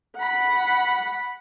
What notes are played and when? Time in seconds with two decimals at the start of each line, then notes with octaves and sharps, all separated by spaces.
0.17 F#5 B5